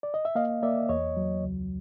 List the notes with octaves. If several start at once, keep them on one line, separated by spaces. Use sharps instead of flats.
D5
D#5
E5
A#3 D#5 F5
A#3 D5 E5
E2 C#5 D#5
F#3
C#2